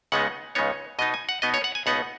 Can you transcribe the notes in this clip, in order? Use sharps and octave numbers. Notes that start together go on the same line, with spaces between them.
C#2 C#3 G#3 B3 D#4 F#5
C#2 C#3 G#3 B3 D#4 C#5
B2 B3 D#4 D#5
G#5
F#5
B2 B3 D#4 D#5
C#5
F#5
G#5
C#2 B2 B3 D#4 F#5